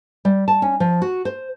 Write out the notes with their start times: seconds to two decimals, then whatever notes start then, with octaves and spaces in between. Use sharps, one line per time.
0.25 G3
0.48 A5
0.62 C#4
0.80 F3
1.02 F#4
1.25 C5